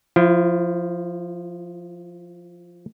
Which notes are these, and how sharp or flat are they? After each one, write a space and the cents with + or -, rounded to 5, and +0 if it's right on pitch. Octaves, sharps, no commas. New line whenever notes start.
F3 +0 E4 +35